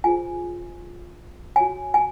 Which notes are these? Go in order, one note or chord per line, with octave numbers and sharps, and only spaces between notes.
F4 G#4 C5 G#5
F#4 C#5 G#5
G#5